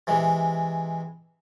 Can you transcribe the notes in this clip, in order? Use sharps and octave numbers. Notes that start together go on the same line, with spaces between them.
C3 E3 G#3